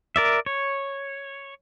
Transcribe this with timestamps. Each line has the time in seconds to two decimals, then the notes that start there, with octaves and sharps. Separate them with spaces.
0.16 A#4 D5 E5
0.46 C#5